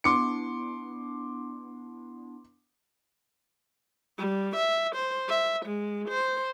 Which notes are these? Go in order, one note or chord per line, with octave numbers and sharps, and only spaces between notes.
B3 D4 E4 C6 D6 C#7
G3
E5
C5
E5
G#3
C5